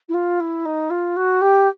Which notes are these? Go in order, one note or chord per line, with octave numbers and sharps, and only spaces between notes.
E4
F4
E4
D#4
F4
F#4
G4